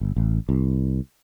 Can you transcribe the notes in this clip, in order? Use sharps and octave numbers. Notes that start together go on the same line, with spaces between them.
G1
A1
C2